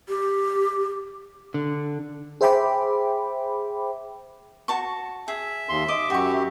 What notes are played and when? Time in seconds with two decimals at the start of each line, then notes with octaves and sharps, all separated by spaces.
0.09 G4
1.54 D3
2.41 G#4 C5 E5 G5 B5 D6
4.68 F#4 A5 C#6
5.28 G#4 E5
5.69 D#2 C6
5.88 D#5 D6
6.10 F#2 F#4 G4 C#6